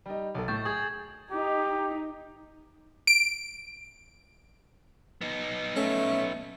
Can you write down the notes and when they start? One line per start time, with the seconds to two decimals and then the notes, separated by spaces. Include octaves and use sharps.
0.06 G3 D#4
0.34 B1 A4
0.48 A2 C#6 G6 A6
0.65 G#4 D#6 G#6
1.31 D#4 G4
3.07 D7
5.21 B3 D#4
5.77 A3 C#4